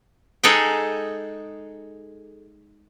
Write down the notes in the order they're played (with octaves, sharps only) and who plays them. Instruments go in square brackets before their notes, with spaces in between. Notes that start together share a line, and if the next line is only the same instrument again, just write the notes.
[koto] G#3 D#4 G#4 A4 F#5 G5